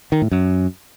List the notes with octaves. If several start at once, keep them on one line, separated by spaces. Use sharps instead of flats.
D#3
A2
F#2